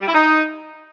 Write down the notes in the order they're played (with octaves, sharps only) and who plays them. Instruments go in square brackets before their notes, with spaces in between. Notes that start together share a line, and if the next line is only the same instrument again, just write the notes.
[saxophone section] G3
E4
D#4